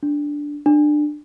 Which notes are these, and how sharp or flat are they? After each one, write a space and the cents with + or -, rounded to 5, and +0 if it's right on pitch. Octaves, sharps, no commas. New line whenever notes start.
D4 -5
D4 +20